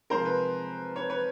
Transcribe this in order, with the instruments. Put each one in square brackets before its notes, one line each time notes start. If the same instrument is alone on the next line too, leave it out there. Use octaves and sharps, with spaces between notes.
[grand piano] C3 F3 G#3 A#4 C5
B4
B4 C#5
B4 C#5